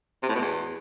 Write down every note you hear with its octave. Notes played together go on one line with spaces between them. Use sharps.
C3
A2
B2
E2